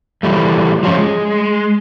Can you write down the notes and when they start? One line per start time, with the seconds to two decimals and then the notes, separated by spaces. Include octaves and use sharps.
0.23 E3 G3 A3
0.83 F3 F#3 C#4
0.97 G#3